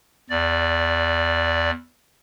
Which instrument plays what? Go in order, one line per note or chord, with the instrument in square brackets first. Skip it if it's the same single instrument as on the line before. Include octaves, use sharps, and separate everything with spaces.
[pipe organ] E2 D5